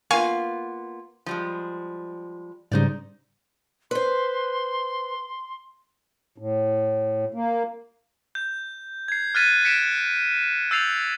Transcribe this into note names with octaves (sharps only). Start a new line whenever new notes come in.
A#3 B3 F4 F5 G#5 C#6
F3 G3 G#3
G#2 C#3 G3 D#4 C5 D5
B4 C5 C6
A2
A#3
G6
G#6 C7
F6 F#6 G#6 A6 B6 D#7
B6 C#7 D7 E7
E6 G6 A6 C7 F7